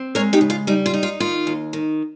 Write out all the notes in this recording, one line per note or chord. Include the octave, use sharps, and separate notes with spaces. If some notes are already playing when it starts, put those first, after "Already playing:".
Already playing: C4
G#3 A#4 C#5
D#4 G4
C#3
F4
G3 D#4
F4
D#4
F4
D#3 F4
D#2
D#3